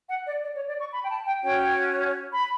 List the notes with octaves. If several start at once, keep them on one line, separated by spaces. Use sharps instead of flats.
F#5
D5
D5
C#5
D5
C#6
B5
G5
A5
G5
C#4 F#4 C#5 G5
B5